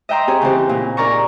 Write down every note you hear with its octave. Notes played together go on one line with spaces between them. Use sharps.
D#5 E5 G5 A#5 C6
C4 G4 G#4 C#5
C#3 E3 C4 G4
A#2
D#4 G#4 A#4 D5 A#5 C#6